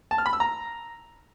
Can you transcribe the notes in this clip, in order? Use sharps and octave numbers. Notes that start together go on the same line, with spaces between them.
A5
F6
B5
E6
A#5